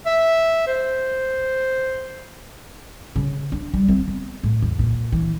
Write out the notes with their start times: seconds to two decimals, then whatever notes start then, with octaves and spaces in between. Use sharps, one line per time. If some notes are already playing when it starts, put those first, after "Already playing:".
0.06 E5
0.67 C5
3.16 C#3
3.52 D4
3.74 G3
3.88 C4
4.08 B3
4.43 A2
4.62 E2
4.79 A#2
5.12 E3